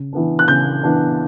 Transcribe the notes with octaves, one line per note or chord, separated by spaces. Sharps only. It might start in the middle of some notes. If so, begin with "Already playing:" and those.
Already playing: C#3
E3 B3 D4
F#6
C#3 G6
E3 B3 D4